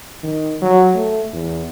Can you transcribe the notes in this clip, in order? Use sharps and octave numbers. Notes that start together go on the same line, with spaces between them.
D#3
F#3
A3
E2